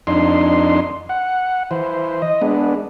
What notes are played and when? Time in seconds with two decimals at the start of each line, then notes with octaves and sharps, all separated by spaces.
0.07 F2 D4 D#4 C6
1.09 F#5
1.71 E3 C5
2.22 D#5
2.42 G#3 B3 D4